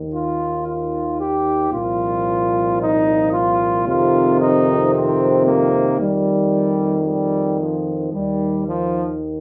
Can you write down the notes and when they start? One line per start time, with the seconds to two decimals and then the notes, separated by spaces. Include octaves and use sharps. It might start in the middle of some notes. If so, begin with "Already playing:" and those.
Already playing: D#2 D#3
0.13 F4
0.66 F4
1.19 G4
1.72 C2 A#2 F3 F4
2.80 D#4
3.33 F4
3.87 F2 C3 D#3 F4
4.40 D#4
4.93 C4
5.45 A#3
5.99 F2 D#3 G3
7.05 G3
7.59 F3
8.13 D#2 D#3 G3
8.66 F3